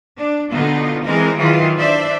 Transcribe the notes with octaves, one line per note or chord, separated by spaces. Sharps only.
D4
B2 D3 B3 D#4 F4
E3 G#3 C4 D#4 A#4
D#3 E3 F#3 F4 G#4
D4 C5 D5 E5